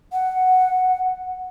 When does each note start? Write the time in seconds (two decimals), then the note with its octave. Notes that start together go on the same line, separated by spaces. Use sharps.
0.13 F#5